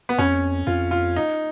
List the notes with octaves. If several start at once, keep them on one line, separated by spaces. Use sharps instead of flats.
B3
F2 C#4
F2 F4
F4
D#4